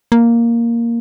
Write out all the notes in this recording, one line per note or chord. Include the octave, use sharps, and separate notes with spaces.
A#3